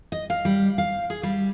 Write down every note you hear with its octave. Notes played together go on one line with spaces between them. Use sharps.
D#5
F5
G3
F5
G#4
G3